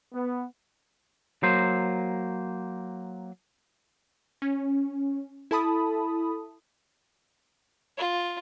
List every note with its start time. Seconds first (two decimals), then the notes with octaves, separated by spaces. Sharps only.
0.13 B3
1.43 F#3 A#3 C5
4.42 C#4
5.51 E4 A4 A5 B5 D#6
7.98 F4